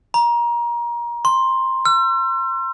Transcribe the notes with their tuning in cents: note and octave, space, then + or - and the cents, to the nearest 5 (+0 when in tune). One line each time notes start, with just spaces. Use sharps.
A#5 +25
C6 +10
E6 +45